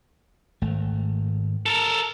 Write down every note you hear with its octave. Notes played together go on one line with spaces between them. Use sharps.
G#1 A3
A4 A#4